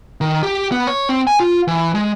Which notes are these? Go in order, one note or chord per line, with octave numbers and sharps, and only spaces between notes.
D#3
G4
B3
C#5
C4
G#5
F4
E3
G#3